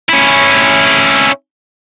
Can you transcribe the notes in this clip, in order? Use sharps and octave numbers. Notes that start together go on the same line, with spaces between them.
C#4 E4